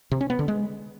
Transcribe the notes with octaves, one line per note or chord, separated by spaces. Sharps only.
C3
C#4
B3
D3
G#3